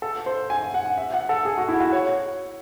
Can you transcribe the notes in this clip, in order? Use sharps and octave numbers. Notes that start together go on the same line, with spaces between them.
A4
C5
G#5
F#5
E5
F#5
A4
G#4
F#4
E4
F#4
C#5